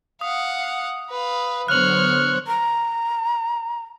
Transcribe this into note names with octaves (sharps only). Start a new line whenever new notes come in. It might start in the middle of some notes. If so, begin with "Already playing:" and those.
F5 F#5 D#6
B4 F5
D3 F#3 B3 C5 C#5 F6 F#6 F#7
A#5